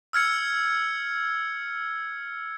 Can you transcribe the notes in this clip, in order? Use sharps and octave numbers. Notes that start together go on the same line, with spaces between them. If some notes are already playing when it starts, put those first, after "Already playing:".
E6 F6 G#6 C#7